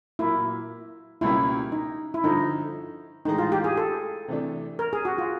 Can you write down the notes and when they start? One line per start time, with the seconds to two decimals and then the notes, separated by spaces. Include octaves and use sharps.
0.19 A#2 F#3 A#3 E4
1.21 C#2 B2 G3 A#3 C#4 E4
1.72 D#4
2.14 E4
2.24 G2 D3 F3 D#4
3.25 A2 E3 G#3 D#4
3.38 F4
3.52 G4
3.64 G#4
3.77 A4
4.28 C3 E3 A3 D4
4.79 A#4
4.93 G#4
5.05 F#4
5.18 F4